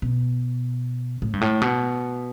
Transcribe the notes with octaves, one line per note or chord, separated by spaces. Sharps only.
B2
A2
G2
A2
B2